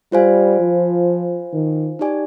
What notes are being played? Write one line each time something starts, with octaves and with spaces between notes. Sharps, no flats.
G3 F4 C5 F5 G#5
F3
D#3
D#4 G4 D5 G#5